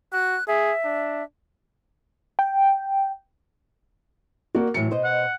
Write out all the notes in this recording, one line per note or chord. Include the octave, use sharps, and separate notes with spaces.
F#4 F#6
G#4 E5
D4
G5
A#3 F#4 D5
A2 E3 F#3 C#7
B2 C5 D#5
F#5